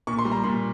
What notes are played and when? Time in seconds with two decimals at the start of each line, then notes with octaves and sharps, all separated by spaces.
0.07 A#2 C#6
0.19 C6
0.25 G3
0.32 A#5
0.44 A#2 C6